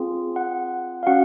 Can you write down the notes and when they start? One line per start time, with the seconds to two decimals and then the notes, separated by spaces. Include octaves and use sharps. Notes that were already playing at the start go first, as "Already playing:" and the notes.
Already playing: C4 F4 G#4
0.36 F#5
1.03 F5
1.06 C#4 F#4 F#5